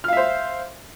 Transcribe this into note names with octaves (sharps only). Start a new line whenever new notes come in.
C5 E5 F5 F6